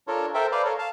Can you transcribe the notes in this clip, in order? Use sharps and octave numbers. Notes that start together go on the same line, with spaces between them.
D4 F4 A4 A#4 C#5
A4 A#4 C5 E5 G5
B4 C5 D5 F5
A4 A#4 C#5
F5 A5